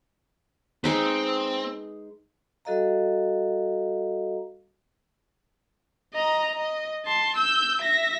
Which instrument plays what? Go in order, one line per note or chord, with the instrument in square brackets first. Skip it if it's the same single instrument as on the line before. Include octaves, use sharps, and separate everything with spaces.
[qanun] G#3 D#4 B4 [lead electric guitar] C4
[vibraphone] G3 F#4 A4 D#5 F5 A#5
[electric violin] D#5 A#5
D#5
A5 C6
E6 G6
E5 A#6